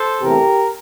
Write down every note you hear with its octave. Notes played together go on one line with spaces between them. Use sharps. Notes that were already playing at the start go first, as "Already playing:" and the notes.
Already playing: A4 C5
E2 C3 E3 A3 G4 A#4